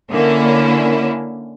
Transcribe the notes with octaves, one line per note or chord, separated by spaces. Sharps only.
D3 A#3 C#4 E4